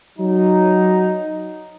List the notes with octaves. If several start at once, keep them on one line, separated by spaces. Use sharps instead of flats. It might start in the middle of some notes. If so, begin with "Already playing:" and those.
F#3 D#4